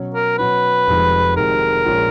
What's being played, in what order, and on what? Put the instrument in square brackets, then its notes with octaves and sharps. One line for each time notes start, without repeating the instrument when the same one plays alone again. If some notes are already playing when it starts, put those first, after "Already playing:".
Already playing: [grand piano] B2 F#3 C#4
[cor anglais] A#4
[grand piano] B2 F#3 C#4 [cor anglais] B4
[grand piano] F1 F2 D#3 G#3
[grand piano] F1 F2 D#3 G#3 [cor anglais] A#4
[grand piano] A#1 A#2 G#3 C#4